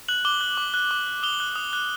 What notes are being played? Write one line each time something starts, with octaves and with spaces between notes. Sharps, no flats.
F#6 F#7
D6 G7
F#6
D6
F#6
D6
F#6
D#6 G7
F#6
D#6
F#6